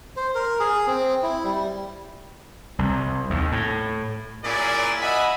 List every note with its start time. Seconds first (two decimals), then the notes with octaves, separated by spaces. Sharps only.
0.17 C5
0.35 A#4
0.60 G#4
0.87 C4
1.23 E4
1.44 G3
2.79 C2
3.30 D#2
3.52 A2
4.44 A#2 F#3 C#4 E4 G#4 D5
5.01 D#5 E5 F#5 G#5 B5